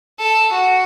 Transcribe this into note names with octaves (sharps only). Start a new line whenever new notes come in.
A4
F#4